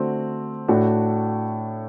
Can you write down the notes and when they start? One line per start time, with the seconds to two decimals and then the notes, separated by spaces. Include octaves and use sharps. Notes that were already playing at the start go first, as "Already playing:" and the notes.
Already playing: D3 A3 C4 F#4
0.68 A2 A3 D4 F#4